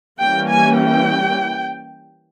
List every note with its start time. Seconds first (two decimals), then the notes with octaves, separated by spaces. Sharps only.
0.20 E3 G3 A#3 C#4 G5
0.49 G#5
0.78 G5